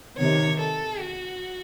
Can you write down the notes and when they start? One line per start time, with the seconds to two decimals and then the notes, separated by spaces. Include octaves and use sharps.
0.18 C3 D#3 C#5
0.60 A4
1.00 F#4